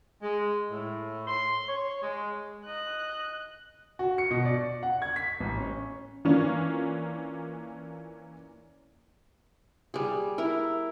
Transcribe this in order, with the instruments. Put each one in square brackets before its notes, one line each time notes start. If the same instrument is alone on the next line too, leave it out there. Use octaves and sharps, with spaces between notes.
[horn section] G#3
A2
C6
C#5
G#3
[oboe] D#5 [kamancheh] F#6
[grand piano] F#4
C#7
B2
D5
F#5
G#6
B6
A1
C#4
[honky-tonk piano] E3 A#3 C#4 D4 F4
[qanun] G3 G#4
E4 A#4